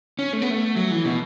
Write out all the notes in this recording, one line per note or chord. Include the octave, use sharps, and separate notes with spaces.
C#4
A3
B3
A3
F#3
E3
B2